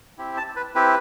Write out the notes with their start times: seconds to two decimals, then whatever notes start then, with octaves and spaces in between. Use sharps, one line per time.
0.18 C4 E4 G4
0.37 A5
0.56 B4
0.75 C4 E4 G4 B4